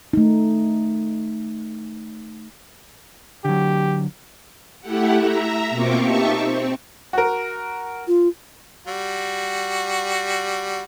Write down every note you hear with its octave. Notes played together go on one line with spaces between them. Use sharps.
A3 D#4
D3 F#3 G4
A3 E4 G4 F#5
E5 A#5
B2 A#3 C4 F4 C#6 D6
D#4 G4 E5 A5 C#6
C4
F#4 A#4
F4
G3 F#4